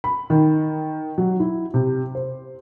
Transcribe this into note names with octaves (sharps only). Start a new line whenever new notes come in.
B5
D#3
F#3
E4
C3
C5